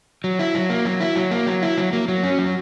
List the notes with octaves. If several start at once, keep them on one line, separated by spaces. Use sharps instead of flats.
F#3
E4
F#3
A#3
F#3
E4
F#3
A#3
F#3
E4
F#3
A#3
F#3
C#4
F#3